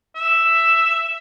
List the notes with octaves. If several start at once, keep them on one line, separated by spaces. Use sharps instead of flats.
E5